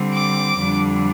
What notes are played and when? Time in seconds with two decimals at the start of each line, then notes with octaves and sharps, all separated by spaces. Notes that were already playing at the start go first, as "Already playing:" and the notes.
Already playing: D3 G3 C4
0.14 D6
0.58 F2 D3 G3 D4